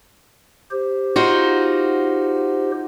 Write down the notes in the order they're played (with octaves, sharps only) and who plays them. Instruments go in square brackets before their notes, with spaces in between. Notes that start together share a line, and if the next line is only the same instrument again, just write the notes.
[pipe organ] G4 C5
[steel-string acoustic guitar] D#4 F4 F#4